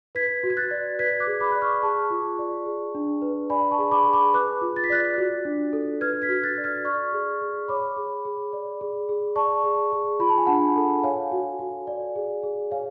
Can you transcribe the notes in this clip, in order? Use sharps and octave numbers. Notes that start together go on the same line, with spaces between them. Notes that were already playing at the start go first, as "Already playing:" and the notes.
B4 G#6 B6
F#4
G#6
F#6 A6
D5
B4 G#6 B6
D6 F#6
G#4
B5 D6
D5 F#6
C#6 F6
G#4 A5 C#6
F4
D5
G#4
D4
B4
D5 G#5 B5
A5 C#6
G#4
B5 D6
G#4
B5 D6
B4 D6 F#6
F4
A6
B6
D5 F#6 A6
F#4
D4
A4
B4 F6 G#6
G#6 B6
F#4
F#6 A6
D5
F6 G#6
D5 C#6 F6
G#4
G#4
C#5 B5 D6
G#4
G#4
D5
G#4
G#4
D5 A5 C#6
G#4
G#4
F4 B5
A5
G#5
D4 F#5 A5
A4
C#5 F5 G#5
F#4
F#4
D5
G#4
G#4
C#5 F5 G#5